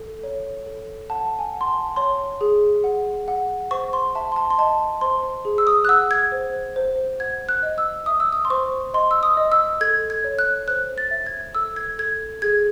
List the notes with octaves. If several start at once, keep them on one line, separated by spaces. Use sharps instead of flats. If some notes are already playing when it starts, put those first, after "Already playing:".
Already playing: A4
C#5
A4
F#5 A5
G#5
F#5
C6
A5
C#5 C6
G#4
F#5
F#5
C5 C#6
C6
E5 A5
C6
A5
C6
D#5 A5
C5 C6
G#4
E6
D#6
F#6
F#5 E6
G#6
C5
C5
F#5 G#6
F#6
D#5
E6
E5 D#6
E6
D#6
C6
C5 C#6
D#5 C6
E6
D#6
D#5
E6
A4 G#6
G#6
C#5
F#6
C5 F#6
A6
E5
G#6
A4 E6
G#6
A4 G#6
G#4 G#6